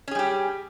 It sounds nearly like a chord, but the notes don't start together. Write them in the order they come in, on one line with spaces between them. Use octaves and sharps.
C#4 G#4 G3 G4